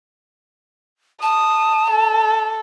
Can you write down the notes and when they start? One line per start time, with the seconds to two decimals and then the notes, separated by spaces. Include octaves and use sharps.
1.22 A5 D#6
1.90 A4